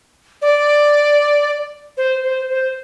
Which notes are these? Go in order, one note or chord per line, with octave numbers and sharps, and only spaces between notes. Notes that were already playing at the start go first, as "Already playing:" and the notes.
D5
C5
C5
C5